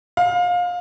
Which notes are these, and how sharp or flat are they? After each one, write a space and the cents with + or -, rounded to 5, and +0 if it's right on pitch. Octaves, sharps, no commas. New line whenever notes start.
F5 +25